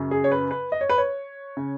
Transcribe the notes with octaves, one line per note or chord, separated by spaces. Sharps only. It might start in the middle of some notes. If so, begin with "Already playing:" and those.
Already playing: F#2 C#3
G#4
C#5
B4
B4
D#5
C#5
B4
C#5
C#3